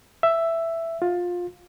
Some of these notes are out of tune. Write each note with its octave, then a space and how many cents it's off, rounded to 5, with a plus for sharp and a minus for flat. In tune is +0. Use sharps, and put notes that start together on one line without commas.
E5 +10
F4 +20